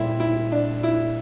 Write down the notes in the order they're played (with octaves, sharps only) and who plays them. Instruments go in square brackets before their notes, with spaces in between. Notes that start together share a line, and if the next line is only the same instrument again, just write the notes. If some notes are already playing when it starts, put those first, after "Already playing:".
Already playing: [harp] A#2 G3 C4 F4 A4 [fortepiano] E4
[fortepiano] E4
D4
E4